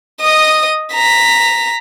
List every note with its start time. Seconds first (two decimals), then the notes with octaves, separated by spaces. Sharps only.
0.21 D#5 D#6
0.94 A#5 B6